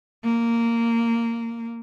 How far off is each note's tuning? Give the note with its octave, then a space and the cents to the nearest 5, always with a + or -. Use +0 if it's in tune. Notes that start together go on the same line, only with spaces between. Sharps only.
A#3 -10